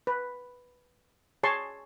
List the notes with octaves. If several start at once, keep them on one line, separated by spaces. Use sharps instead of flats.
B4
G#4 C#5 A5 C6 C#6